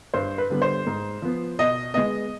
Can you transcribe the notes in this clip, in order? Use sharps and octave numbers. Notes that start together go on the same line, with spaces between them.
G2 C5
B4
D3 G3 B3
C5
G#2
F3 B3
B2 D#5
G#3 B3 D#5